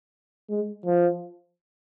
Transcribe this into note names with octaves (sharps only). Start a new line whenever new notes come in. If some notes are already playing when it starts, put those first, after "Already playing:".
G#3
F3